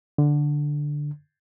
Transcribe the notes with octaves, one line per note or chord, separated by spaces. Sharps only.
D3